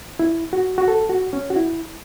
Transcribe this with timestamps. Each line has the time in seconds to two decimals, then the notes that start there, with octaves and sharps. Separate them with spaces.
0.19 E4
0.53 F#4
0.78 F#4
0.88 A4
1.10 F#4
1.33 C#4
1.50 F#4
1.56 E4